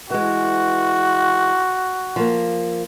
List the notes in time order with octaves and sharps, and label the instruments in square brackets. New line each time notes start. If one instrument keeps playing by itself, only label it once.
[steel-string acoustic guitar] E3 G#3 [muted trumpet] F#4
[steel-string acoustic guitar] F3 A#3